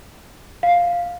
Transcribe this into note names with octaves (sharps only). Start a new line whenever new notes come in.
F5